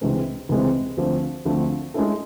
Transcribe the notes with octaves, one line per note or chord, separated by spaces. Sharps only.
C#2 C3 E3 G#3 C4
C#2 C3 E3 G#3 C4
D2 D3 F3 A3 C4
D2 D3 F3 A3 C4
G#3 C#4 E4 A4